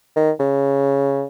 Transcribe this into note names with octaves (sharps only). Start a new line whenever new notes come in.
D#3
C#3